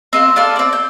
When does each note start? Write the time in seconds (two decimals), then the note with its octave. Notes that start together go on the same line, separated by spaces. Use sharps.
0.13 C4 D#5 F5
0.36 D4 F4 A4 F6
0.56 C4 D5
0.73 G6